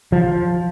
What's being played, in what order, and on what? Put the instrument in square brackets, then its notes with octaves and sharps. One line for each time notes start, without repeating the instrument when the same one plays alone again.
[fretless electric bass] F3